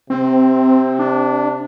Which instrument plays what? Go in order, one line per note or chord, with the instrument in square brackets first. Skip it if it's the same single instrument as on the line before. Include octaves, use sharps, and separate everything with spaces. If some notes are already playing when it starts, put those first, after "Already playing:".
[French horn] C3 [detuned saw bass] C4
[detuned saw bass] D4